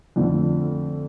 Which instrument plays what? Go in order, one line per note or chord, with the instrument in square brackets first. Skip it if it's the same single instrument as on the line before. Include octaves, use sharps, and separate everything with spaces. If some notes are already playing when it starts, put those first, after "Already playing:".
[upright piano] F2 D3 F3 A3